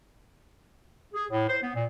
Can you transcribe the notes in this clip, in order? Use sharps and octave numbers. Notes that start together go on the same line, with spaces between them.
G#4
A2
C5
B3
A#2